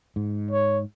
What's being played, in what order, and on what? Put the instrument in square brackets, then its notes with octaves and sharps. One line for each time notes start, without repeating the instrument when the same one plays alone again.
[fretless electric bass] G#2
[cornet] C#5